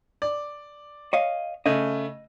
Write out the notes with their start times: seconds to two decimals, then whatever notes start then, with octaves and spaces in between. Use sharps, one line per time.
0.22 D5
1.13 C#5 D#5 F5
1.66 C#3 A3 D#5